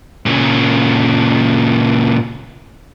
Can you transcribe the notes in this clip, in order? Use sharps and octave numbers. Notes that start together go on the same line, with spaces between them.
A#2 C#3